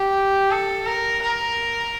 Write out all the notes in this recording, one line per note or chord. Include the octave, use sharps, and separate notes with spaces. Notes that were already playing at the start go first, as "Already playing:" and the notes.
Already playing: G4
A4
A#4
A#4